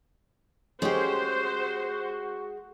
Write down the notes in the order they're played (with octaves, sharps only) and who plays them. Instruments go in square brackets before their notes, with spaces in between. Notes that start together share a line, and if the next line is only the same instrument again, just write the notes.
[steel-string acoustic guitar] G#3 [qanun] C#4 G4 [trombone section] F#4 [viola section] C5